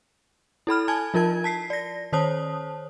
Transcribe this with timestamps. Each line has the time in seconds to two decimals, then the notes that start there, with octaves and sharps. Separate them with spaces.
0.67 E4 A4 B5 F6
0.88 G#5 A5 G#6
1.14 F3 F4 A#4 A5 G#6
1.44 A5 B6 C7
1.70 D5 A#6
2.13 D#3 C5 C#5 A5 D#6